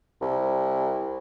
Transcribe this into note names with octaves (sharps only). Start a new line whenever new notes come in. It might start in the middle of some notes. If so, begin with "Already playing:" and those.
C2